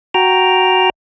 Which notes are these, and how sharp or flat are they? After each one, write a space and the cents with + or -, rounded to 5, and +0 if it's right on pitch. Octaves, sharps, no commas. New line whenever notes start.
F#4 +5 G5 +0 A#5 +0